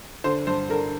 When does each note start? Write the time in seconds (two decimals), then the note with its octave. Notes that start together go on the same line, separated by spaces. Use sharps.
0.24 D3 C5
0.47 G2 C5
0.70 D3 A#4